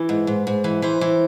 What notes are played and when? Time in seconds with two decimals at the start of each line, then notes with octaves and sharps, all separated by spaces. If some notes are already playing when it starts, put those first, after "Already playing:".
Already playing: E3 B4
0.09 G#2
0.27 G#2
0.47 G#2
0.64 E3
0.82 E3 C5
1.01 E3